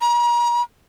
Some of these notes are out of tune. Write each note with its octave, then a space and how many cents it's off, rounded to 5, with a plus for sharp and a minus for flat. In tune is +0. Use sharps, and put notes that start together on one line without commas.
A#5 +40